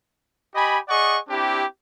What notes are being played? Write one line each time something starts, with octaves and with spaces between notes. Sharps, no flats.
G4 D#5 G#5 B5
G#4 D5 D#5 F#5 C#6
C4 D4 E4 G4